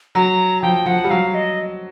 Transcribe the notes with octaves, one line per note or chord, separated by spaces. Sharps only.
F#3 A#5
F3 G5
F3 F#5
G3
F#3 F5
D#5